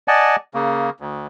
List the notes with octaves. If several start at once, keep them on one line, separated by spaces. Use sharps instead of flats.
D5 D#5 F#5 G#5 A5
C#3 A#3
D2